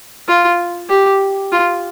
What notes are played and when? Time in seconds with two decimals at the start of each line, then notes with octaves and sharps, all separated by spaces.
0.28 F4
0.89 G4
1.52 F4